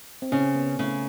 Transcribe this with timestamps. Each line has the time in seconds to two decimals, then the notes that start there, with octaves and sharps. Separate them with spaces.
0.22 C4
0.32 C#3 C#4
0.55 B3
0.79 C#3 A3